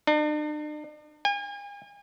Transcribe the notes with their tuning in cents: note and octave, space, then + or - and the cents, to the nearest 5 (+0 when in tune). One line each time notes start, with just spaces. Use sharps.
D4 +45
G#5 -40